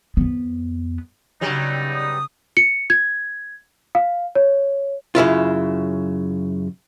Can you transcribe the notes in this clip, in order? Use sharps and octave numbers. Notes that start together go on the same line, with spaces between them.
F2 B3
G2 C#3 F#3 G3 D#4
D#6
C#7
G#6
F5
C#5
F#2 C#3 E4 F4